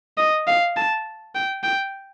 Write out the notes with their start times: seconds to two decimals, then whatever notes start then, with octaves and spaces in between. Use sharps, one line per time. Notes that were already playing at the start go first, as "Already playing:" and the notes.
0.18 D#5
0.47 F5
0.76 A5
1.35 G5
1.63 G5